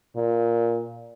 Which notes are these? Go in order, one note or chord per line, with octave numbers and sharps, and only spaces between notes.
A#2